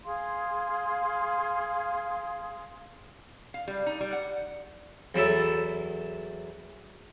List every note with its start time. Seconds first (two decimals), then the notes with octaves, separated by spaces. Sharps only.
0.05 G#4 F5 C6
3.54 F5
3.68 G3
3.86 D#4
4.00 G3
4.13 F#5
5.15 E2 F#3 E4 A4